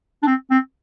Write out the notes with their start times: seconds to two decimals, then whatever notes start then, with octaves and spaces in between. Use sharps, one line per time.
0.23 D4
0.27 C4
0.51 C4